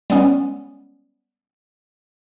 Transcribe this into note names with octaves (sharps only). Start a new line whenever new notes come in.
G3 G#3 B3 C#4